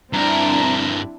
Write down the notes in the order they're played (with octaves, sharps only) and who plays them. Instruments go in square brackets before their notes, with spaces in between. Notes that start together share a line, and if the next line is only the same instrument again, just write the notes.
[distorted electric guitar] G2 A#4 [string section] C4 D4 E4 [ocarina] A#5